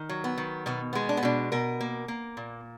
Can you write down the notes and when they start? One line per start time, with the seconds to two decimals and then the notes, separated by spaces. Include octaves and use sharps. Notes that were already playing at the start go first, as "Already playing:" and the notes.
Already playing: D#3
0.09 F#3
0.24 B3
0.38 D#3
0.66 B2 B3
0.93 G#3 B3
1.09 D4
1.17 B3
1.23 B2 D4
1.52 B2 A#4
1.81 A#3
2.08 A#3
2.37 A#2